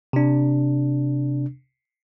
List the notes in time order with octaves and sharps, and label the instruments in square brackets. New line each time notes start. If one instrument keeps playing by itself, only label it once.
[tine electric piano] C3 D4